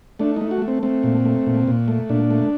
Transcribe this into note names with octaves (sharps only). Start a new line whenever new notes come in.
A3 D4
A3 D#4
F#4
A3
C4
A3 C4
A#2
A3
A#2
A#2
A3
A#2 D4
A3